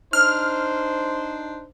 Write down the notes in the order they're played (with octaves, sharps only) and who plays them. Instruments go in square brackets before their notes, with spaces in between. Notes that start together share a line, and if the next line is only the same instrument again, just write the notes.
[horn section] D4 D#4 C5 [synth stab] F6